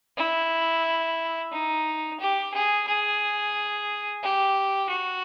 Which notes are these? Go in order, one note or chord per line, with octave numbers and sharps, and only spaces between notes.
E4
D#4
G4
G#4
G#4
G4
F#4